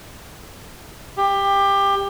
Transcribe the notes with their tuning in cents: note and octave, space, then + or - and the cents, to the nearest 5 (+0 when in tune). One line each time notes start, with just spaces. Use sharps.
G4 +20